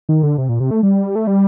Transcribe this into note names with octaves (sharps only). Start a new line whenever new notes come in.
D#3
D3
C3
A#2
C3
A3
G3
A3
G3